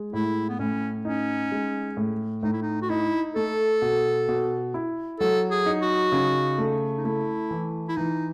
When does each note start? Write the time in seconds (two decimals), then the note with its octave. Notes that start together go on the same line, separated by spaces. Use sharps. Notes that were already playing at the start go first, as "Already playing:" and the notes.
Already playing: G#3
0.13 A2 E4
0.49 B3
0.59 A2 C#4
1.05 C#4 D#4
1.52 G#3
1.97 A2
2.43 A2 D#4
2.53 E4
2.62 D#4
2.82 F#4
2.89 D#4 E4
3.35 A3 A4
3.82 B2
4.28 B2
4.74 E4
5.20 F#3 A4
5.51 G#4
5.66 D#4
5.82 F#4
6.12 C#3
6.58 A3
6.97 D#4
7.05 A3 E4
7.51 E3
7.88 E4
7.96 E3 D#4